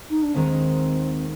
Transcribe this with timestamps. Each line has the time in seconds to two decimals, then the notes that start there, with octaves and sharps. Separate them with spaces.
0.09 D#4
0.22 D4
0.34 D#2 D#3 G#3 C4 D#4